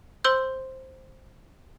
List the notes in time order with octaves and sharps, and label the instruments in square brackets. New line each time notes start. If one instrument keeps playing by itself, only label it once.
[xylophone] C5 C6 E6 G6